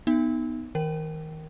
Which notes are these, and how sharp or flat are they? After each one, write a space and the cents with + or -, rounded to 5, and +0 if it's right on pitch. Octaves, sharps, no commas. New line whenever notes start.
B3 +0 D#4 +0 E5 +30
D#3 +35 A#4 +0 G5 -25